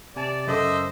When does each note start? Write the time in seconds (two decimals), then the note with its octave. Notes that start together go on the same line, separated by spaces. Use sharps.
0.16 C3 D5 G#5 A5
0.47 F#2 C#3 A4 C5 D#5 E5 D6